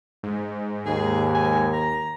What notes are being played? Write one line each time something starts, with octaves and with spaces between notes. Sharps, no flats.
G#2
D#2 G#4
G#5
A#5